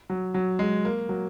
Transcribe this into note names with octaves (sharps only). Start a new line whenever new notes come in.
F#3
F#3
G#3
A#3
F#3